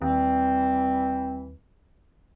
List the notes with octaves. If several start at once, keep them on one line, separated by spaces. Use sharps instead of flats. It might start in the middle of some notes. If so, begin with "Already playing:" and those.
D#2 E3 G3 C4